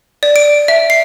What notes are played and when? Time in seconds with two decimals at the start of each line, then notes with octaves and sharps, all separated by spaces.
0.23 D5
0.36 D7
0.68 E5
0.90 C7